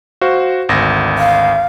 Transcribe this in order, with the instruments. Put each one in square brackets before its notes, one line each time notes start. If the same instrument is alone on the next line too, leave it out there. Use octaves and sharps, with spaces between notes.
[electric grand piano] F#4 C5 F5
G#1 D2 A#6
[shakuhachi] F5